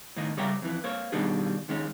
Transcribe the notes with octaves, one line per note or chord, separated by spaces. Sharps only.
A2 D#3 D#5
C#3 G3 C#5 E5 G5 A#5
F2 E3
A#3 C5 C#5
B2 D#3 G3 D4 G#4
D#3 G#3 C#4